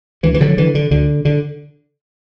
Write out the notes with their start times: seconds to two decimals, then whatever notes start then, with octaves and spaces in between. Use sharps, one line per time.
0.23 D2 E3
0.34 E3
0.41 D3 F#3
0.57 D3 E3
0.75 D3
0.91 D2 D3
1.25 D3